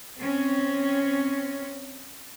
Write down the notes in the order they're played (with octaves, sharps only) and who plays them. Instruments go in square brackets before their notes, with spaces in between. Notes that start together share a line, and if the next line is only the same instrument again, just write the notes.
[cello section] C4 C#4